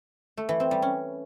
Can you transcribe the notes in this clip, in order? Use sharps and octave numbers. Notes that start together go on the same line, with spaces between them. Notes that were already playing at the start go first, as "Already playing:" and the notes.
A3
E3
C4
G3
C#4